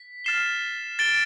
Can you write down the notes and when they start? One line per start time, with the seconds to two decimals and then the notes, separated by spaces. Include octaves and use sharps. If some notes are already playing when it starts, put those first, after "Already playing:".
Already playing: B6
0.25 F6 A6 C7 E7 G7
0.99 A6 D7 G7